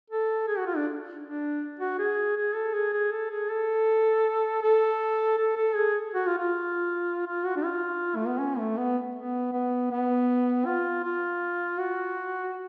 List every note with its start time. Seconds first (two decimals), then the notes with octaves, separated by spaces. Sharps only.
0.10 A4
0.48 G#4
0.57 F#4
0.67 F4
0.76 D4
1.23 D4
1.80 F#4
1.99 G#4
2.36 G#4
2.55 A4
2.74 G#4
2.93 G#4
3.12 A4
3.30 G#4
3.49 A4
4.63 A4
5.38 A4
5.57 A4
5.76 G#4
6.14 F#4
6.26 F4
6.38 F4
7.26 F4
7.45 F#4
7.56 D4
7.64 F4
8.16 A3
8.27 B3
8.40 C#4
8.58 A3
8.77 B3
9.15 B3
9.53 B3
9.91 B3
10.66 F4
11.04 F4
11.79 F#4